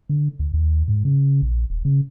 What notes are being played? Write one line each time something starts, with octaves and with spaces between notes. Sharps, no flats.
D3
D2
D#2
G#2
C#3
A#1
D#1
C#3